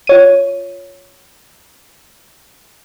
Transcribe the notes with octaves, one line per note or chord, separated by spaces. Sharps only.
F4 C#5 D#7